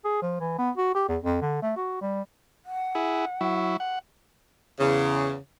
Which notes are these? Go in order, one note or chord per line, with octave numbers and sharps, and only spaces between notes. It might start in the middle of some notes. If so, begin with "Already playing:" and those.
G#4
F3
E3
B3
F#4
G4
E2
F2
D3
A3
F#4
G3
F#5
E4 G#4
F#3 E4
F#5
E2 C#3